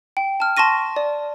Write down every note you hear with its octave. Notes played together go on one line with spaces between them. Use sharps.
G5
A5 F6
A5 C6 C#6 A#6 D#7
D5